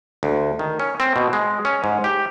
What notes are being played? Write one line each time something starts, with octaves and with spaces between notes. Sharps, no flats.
D2
D#3
C#4
C4
B2
G#3
C#4
G#2
G4